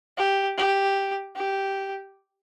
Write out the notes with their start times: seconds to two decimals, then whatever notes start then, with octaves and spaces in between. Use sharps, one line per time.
0.18 G4
0.58 G4
1.36 G4